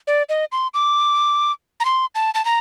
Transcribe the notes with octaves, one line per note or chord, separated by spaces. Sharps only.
D5
D#5
C6
D6
A#5
C6
A5
A5
A#5